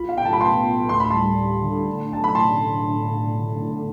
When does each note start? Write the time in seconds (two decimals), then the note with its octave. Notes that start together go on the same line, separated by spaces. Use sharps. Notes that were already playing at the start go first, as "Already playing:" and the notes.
Already playing: B1 F4 B5
0.09 F5
0.17 A2 G5
0.25 A5
0.33 B5
0.41 B3 A5 C6
0.65 A2
0.89 D2 C6
1.00 B5
1.10 G3 A5 C6
1.38 G3
1.62 D3
1.87 A2
2.11 B1 A5
2.24 B5
2.34 A2 A5 C6